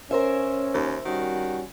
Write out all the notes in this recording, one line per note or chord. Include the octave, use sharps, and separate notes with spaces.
C#4 A#4 C5 E5
D#2
D#3 G3 C#4 F#4